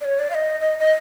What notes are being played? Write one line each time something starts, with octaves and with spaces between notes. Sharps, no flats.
D5
C#5
D5
F5
D#5
D#5
D#5